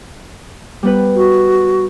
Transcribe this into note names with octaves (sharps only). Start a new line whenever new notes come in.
G3 B3 B4
F#4